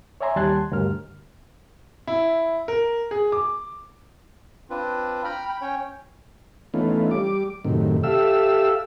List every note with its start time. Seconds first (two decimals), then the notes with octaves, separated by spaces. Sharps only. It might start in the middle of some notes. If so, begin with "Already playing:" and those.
0.21 C#5 D5 E5 G#5 A#5 C6
0.36 D#2 G3 A5 C6 F#6 G#6
0.71 D2 G2 A#4 F6
2.07 E4
2.68 A#4
3.11 G#4
3.32 D6
4.70 C4 D4 F4 B4
5.24 G5 A#5 B5 F6
5.49 G5 B5
5.61 C#4 C#5 G5
6.74 E3 A3 B3 C#4 D#4 F4
7.11 G3 D6
7.64 F#2 A2 C3 D#3
8.03 G4 A4 E5 F5 E6